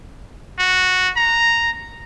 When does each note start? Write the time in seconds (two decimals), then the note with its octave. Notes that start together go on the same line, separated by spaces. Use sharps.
0.59 F#4
1.17 A#5